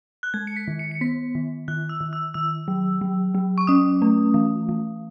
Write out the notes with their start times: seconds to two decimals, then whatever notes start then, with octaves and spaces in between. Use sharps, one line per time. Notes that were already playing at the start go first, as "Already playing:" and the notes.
0.23 F#6
0.34 G#3 G#6
0.47 C#7
0.56 B6
0.68 D#3
0.79 C#7
0.91 C#7
1.01 B3 B6
1.35 D#3
1.68 D#3 F#6
1.89 E6
2.01 D#3
2.13 E6
2.34 D#3 E6
2.68 F#3
3.01 F#3
3.35 F#3
3.58 C#6
3.67 C#4 D#6
4.02 A3
4.34 E3
4.69 E3